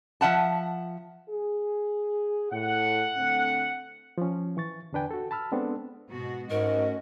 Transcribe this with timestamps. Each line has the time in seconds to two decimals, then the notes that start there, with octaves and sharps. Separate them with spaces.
0.21 F3 E5 F#5 A5
1.30 G#4
2.52 A2 F#5
3.16 D3 A3 C4
4.18 F3 C#4
4.57 E3 C#6 A6
4.93 E2 D3 D4 B4 G5 G#5
5.11 F#4 A4
5.31 A5 B5 E6 F6
5.52 G#3 B3 C4 D4 A4
6.09 G#2 B2 F#4
6.50 G#2 A3 C#4 F#4 A#4 D#5